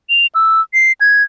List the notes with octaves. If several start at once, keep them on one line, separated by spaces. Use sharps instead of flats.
F7
E6
C7
G#6